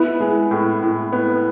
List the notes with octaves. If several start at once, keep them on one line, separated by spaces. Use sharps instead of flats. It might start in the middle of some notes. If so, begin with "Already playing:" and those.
Already playing: B3 E4
G#3
A2
A2
B3